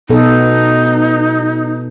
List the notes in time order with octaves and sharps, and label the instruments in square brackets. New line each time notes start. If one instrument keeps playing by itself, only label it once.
[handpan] B2 B3 A4 [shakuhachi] D#4